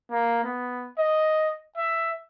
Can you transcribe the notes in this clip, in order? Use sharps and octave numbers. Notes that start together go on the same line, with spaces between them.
A#3
B3
D#5
E5